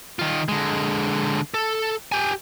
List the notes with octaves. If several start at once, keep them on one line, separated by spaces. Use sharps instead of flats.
D#3 F4
D3 G#3
A4
G4 G#5